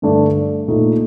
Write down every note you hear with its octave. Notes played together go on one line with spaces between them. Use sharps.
G2 D3 A3 D4
A#2 A3 D#4